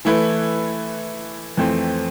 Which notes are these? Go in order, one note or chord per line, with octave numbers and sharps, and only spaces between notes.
E3 A3 E4 B4
F2 E3 A3 C4